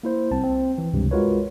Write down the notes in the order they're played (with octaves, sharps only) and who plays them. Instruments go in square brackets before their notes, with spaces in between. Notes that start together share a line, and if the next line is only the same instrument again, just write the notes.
[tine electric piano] A#3 E4 C5
C2 C4 A5
C4
E3
C#2 G2 C3
G#3 F4 F#4 A#4 B4 C#5